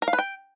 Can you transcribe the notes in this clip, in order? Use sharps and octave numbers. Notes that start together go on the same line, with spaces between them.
A#4
F5
B4
G5